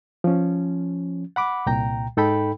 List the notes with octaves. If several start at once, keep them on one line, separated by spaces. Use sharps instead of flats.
F3 C#4
F#5 B5 D6
C2 A#2 G5 A#5
G#2 D#4 A4 G5 B5